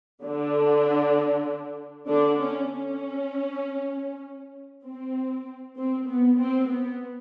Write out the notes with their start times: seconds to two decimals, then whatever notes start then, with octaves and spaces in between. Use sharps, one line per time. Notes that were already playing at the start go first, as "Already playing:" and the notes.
0.24 D3 D4
2.08 D3 D4
2.39 C#4
2.70 C#4
4.84 C4
5.76 C4
6.07 B3
6.37 C4
6.68 B3